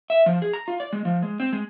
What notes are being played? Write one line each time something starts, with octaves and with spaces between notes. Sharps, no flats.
E5
F3
G#4
A#5
F4
D5
G#3
F3
G#3
C4
G#3